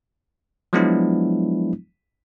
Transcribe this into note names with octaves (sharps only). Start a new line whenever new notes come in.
F3 F#3 G#3 B3 D4 E4